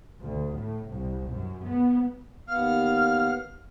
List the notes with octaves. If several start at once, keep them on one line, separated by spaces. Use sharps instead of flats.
D2
A2
C2
F#2
B3
D#2 B3 F5 F6